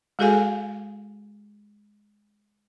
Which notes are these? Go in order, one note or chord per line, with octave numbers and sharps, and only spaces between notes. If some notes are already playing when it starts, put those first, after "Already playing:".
G#3 F#4 G#4 A4 F5 G#5